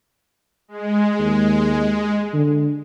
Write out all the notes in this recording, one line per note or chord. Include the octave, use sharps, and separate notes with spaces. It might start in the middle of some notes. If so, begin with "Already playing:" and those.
G#3
D#2
D3